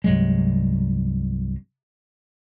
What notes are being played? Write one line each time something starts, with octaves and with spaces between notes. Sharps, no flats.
C2 G2 F#3 G#3